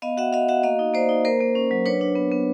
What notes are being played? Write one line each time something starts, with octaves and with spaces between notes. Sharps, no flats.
B3 D#5 F5
F#4 E5 F#5
F#4 D#5 F5
F#4 E5 F#5
A#3 D#5 F5
D#4
A#3 C5 D5
D#4
A#3 A#4 C5
A#3
C#4
F#3
D4 B4 C#5
D4
B3
B3